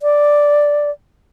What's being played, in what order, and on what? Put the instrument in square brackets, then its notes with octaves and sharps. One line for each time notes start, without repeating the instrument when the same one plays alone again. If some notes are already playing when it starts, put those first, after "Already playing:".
[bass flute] D5